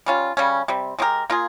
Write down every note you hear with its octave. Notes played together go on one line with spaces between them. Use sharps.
G3 C#4 F4
C#3 G3 C#4
C3 G3 C4
G#3 C4 G4 A#4
A#3 F4 G#4